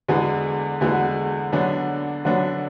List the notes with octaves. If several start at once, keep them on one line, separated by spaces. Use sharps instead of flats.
E2 D3 G#3 B3 F#4
E2 D3 G#3 B3 F#4
D3 F#3 B3 D4 F#4
D3 F#3 B3 D4 F#4